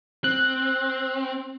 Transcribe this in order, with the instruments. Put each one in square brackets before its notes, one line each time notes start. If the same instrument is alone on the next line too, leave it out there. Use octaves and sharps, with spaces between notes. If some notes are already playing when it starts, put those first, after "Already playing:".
[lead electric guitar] C4 [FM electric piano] F#6